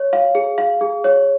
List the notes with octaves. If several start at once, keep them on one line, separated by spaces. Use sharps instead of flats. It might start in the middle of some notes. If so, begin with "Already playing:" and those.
Already playing: C#5
F5
G#4
F5
G#4
C#5